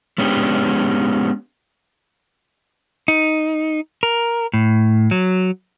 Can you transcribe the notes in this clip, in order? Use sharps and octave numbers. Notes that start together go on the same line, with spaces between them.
G#3 B3 C#4 D4 G4
D#4
A#4
A2
F#3